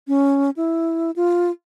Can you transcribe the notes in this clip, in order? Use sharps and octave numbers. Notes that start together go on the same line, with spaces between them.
C#4
E4
F4